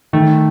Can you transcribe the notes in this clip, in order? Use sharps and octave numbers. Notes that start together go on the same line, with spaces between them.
D#3 A3